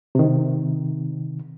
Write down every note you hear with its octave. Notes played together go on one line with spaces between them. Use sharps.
C3 D#3